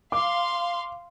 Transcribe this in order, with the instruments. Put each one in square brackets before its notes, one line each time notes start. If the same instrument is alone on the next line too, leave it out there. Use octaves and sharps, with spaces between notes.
[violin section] F5 C6 [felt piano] D6